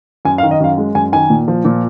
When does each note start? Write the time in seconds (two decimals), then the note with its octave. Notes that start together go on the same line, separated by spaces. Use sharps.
0.25 F#2 G#5
0.38 F5
0.43 D#3
0.51 D#5
0.60 F#2 F5
0.77 G#3
0.95 F#2 G#5
1.12 D#3 G#5
1.30 A#2
1.48 F3
1.65 A#2